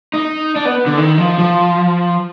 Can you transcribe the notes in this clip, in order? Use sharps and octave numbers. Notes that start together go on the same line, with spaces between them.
D#4
D4
B3
D3
D#3
F3
F3